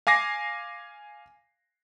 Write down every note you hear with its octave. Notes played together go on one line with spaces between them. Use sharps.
F5 G#5 D6 A#6 C7